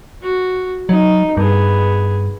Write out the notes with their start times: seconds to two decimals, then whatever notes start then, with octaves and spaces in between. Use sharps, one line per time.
0.23 F#4
0.89 F#3 D#4
1.37 G2 B3 G#4